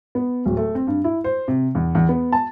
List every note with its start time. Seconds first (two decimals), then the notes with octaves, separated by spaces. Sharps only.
0.15 B3
0.46 D1
0.57 A3
0.75 C4
0.87 G2
1.04 E4
1.24 C5
1.48 C3
1.75 E2
1.95 E2
2.09 B3
2.32 A5